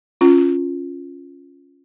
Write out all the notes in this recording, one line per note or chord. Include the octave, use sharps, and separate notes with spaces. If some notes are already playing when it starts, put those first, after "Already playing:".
C#4 F4